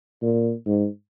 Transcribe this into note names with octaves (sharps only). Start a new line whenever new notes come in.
A#2
G#2